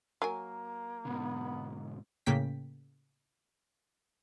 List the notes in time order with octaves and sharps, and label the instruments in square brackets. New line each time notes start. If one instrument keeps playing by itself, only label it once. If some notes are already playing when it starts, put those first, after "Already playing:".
[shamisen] F#3 A#4 G#5 [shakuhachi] A#3
[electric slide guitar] G#2 B2 D3 [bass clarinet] B3
[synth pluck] A2 C#3 A#3 G5 B6